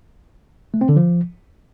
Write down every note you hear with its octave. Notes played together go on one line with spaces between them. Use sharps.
A3
C4
D3
F3